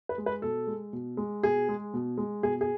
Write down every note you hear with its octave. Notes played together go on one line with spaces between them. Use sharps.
B4
G#3
B4
B2 A4
G#3
B2
G#3
B2 G#4
G#3
B2
G#3
B2 G#4
G#4